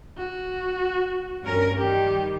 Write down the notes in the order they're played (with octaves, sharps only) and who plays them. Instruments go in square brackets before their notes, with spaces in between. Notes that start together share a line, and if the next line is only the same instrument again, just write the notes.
[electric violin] F#4
[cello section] G2 C#4 A#4
[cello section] D#3 G3 [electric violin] G4